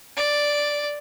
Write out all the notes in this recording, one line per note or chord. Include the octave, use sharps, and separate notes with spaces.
D5